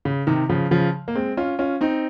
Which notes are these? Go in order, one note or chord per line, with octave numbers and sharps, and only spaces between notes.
C#3
C3 D#3
C#3 F3
C#3 F3
A#3
G#3 C4
C#4 F4
C#4 F4
C4 D#4